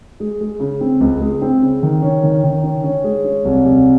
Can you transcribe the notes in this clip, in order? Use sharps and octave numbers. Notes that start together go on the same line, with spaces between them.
G#3
G#3
C#3
C4
C#2
G#3
C4
C#3
D#3
C#4
D#3
D#3
C#4
C#4
G#3
C#4
C2
C2